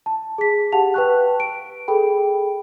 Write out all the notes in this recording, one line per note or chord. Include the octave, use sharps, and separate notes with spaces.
A5
G#4 B6
G4 F5 F#5 A5 F7
B4 G5 A5 C#6 F#6
D7
G#4 A4 G5 B5